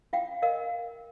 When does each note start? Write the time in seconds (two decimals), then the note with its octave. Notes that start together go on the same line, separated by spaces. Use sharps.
0.13 F4 F5 G5
0.42 A#4 D#5 F5